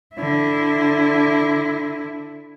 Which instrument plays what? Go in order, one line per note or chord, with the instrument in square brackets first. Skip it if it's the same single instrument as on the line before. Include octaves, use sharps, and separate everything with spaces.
[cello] D3 E4